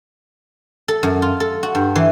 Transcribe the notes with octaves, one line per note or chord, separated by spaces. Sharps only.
A4
F#2
F4
A4
F#4
G2
E3